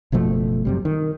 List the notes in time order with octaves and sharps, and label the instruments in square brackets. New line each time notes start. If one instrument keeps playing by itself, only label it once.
[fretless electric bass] F#1 B2 F3 A3
F#2 C3 G3
D#3